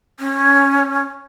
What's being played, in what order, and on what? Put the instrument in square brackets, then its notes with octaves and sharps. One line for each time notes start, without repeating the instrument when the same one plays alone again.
[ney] C#4